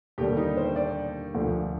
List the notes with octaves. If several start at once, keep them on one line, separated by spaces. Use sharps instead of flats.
D#2 D3 G3 G4
D#4
C5
D5
D2 D3 F3